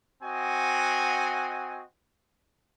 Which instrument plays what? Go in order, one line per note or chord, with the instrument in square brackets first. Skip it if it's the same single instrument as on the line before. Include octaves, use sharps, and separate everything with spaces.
[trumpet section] C4 F#4 D#5 F#5 G#5